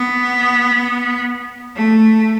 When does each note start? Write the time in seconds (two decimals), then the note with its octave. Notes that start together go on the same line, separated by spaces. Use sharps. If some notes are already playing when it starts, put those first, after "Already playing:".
Already playing: B3
1.76 A3